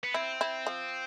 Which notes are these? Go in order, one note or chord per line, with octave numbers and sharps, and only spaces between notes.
B3
C4 E4
E4
F3